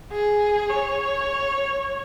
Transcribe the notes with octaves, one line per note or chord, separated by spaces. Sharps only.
G#4
C#5